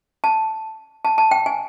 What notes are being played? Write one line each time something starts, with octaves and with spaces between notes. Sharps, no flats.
A5
A5
A5
G5
G#5